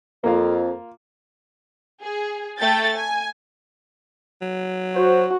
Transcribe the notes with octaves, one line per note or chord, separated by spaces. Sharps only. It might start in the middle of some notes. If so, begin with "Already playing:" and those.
F2 A#3 F4
G#4
A3 G5 A6
G#5
F#3
F#4 C5